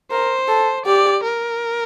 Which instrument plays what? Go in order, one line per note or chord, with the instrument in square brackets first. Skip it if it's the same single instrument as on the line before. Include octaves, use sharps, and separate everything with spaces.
[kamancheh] A#4 [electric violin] C5
[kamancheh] A4
[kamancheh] G4 [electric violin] D5
[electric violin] A#4